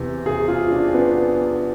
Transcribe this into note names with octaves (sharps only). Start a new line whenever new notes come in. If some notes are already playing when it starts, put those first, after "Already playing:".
Already playing: E2 C3 E3
G#4
F4
D4
B3